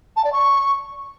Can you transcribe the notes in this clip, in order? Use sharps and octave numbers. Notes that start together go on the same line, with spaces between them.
A5
D5
C#6